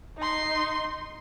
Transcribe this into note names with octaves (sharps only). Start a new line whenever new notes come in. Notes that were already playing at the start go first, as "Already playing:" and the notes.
D#4 C6